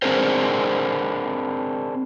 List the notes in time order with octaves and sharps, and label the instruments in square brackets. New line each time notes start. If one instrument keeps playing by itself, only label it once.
[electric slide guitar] C4 D4 G#4 A#4 C5